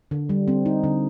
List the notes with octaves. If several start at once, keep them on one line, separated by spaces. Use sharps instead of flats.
D3
G3
C4
D#4
D3